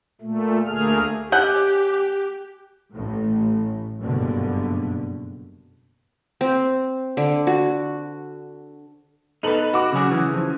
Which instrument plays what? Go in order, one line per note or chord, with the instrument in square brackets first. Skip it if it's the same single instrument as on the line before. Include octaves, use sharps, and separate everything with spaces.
[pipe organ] A#2 A3
D2 A3 A#3 G#4 F6
[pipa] C#4 D#5 F#5 [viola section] G4 [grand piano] G#5 F#6 G6
[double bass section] A1 A2
F#1 G2 B2 D3
[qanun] C4
D3
F#4
[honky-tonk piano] B3 A4 F#7 [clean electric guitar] D#4 B4
[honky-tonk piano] F#4 D6
[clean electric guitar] C#3 F#3 G#4
C#3 E3
[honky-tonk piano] F3